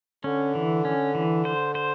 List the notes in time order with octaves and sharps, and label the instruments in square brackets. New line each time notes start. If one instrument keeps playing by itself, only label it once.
[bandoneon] D3 [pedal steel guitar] C#4
[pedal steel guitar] E3
C#4
E3
C5
C5